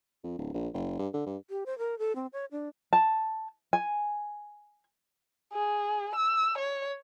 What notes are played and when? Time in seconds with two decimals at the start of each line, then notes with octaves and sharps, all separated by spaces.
0.24 F2
0.38 D1
0.54 A#1
0.74 F#1
0.99 G2
1.13 D3
1.26 G2
1.49 G4
1.66 C5
1.78 A#4
1.99 A4
2.16 C4
2.33 C#5
2.52 D4
2.93 A5
3.73 G#5
5.53 G#4
6.16 E6
6.58 C#5